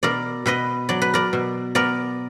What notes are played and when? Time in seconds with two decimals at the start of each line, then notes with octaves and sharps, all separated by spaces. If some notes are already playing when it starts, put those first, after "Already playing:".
0.03 B2 A#4 D5
0.46 B2 B4 D#5
0.89 F#3 D5
1.02 B4
1.14 A#4 D5
1.33 B2
1.75 B3 A#4 D5